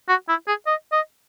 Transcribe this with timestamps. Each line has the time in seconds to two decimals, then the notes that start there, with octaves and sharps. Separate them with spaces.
0.09 F#4
0.29 E4
0.48 G#4
0.67 D#5
0.92 D#5